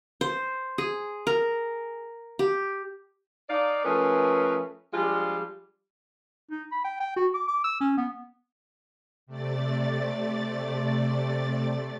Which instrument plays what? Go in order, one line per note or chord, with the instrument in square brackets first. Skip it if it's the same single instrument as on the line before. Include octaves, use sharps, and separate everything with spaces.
[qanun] C5
G#4
A#4
G4
[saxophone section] D#4 D5 F5
F3 A3 C#4 G#4 A#4 B4
F3 G3 G#3 D4 F4
[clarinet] D#4
B5
G5
G5
F#4
D6
D6
E6
C#4
B3
[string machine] C3 A3 D5 A6